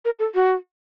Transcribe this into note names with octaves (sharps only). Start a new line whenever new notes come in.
A#4
A4
F#4